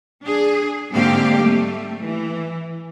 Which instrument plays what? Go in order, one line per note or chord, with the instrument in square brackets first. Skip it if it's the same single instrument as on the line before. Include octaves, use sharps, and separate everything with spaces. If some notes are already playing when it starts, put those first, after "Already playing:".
[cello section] D4 G#4
G#2 D3 A#3 C4 G4 F5
G3 A3
E3